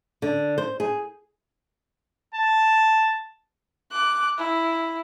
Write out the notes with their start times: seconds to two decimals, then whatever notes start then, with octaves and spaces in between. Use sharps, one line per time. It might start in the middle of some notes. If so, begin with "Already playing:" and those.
0.22 D3
0.58 C5
0.80 G#4
2.34 A5
3.92 D6 F#6
4.38 E4